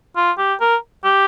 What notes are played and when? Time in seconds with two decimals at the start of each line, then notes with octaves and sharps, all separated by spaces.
0.16 F4
0.38 G4
0.61 A#4
1.05 G4